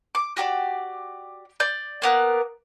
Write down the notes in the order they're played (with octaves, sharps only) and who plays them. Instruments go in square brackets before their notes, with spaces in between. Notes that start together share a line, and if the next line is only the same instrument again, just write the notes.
[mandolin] D6
F#4 G4 A4 D5
D5 G6
A#3 B3 A#4 F#6